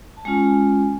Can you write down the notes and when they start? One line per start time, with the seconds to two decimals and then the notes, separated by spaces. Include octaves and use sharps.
0.17 A5
0.25 G#3 C#4 F4 G#5